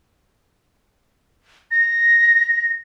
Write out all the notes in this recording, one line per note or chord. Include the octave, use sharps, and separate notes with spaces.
A#6